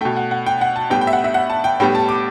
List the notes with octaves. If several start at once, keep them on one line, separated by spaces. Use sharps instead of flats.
B2 A3 G5
F#5
F#5
G5
F#5
A5
A2 G3 B3 G5
G5
E5
F#5
E5
F#5
A5
G5
A2 G3 B3 G5
A5
D6